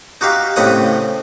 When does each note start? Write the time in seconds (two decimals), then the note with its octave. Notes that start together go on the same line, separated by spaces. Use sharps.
0.21 D#4 F#4 G4 F5
0.56 A2 C#3 C4 D#5 F#5 B5